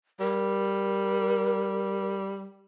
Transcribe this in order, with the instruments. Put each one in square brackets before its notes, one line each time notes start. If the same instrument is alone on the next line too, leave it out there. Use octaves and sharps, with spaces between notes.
[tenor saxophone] G3 [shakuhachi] A#4